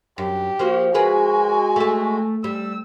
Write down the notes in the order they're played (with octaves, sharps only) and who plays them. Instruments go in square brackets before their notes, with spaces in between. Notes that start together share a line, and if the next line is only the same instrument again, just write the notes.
[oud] F#2 [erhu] G4
[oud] F3 A#3 F#4
[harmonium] G#3 F#4 [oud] G#4 A#4 B4 [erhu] G#5
[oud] A3 A4
[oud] G3 [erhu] E6